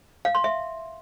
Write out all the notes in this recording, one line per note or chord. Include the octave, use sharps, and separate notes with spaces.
F5
C6
E5